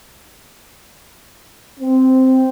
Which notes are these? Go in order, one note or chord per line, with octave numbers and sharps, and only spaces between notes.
C4